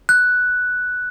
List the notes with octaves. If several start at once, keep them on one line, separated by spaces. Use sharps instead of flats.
F#6